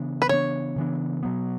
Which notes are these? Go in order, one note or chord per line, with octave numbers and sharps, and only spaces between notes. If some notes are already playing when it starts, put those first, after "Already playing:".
Already playing: C#3 E3 B3 D4
B4
C#3 E3 B3 D4 C#5
C#3 E3 B3 D4
B2 F#3 B3